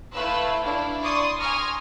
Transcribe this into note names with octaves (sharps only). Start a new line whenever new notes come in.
A3 E4 B4 F5 E6 F#6
D4 E4 F5
D5 C6 C#6 D#6
G#5 A#5 C6 C#6 D#6 F6